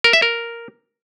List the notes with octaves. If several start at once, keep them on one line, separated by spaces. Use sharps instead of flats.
A#4
E5
A#4